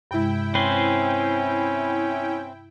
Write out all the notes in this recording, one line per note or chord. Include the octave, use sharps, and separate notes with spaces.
G2 C3 G#3 E4 G5
C4 C#4 B4 C5